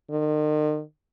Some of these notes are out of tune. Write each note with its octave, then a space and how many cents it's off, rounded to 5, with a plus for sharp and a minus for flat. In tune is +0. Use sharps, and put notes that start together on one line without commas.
D#3 -40